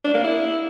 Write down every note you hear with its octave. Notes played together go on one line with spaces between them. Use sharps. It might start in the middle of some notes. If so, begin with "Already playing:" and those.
D4
A#3
E4